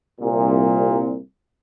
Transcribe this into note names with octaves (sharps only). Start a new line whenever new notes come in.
C2 A#2